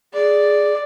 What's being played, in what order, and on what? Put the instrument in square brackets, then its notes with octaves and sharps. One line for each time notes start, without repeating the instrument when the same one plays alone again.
[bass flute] G#4 [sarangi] D5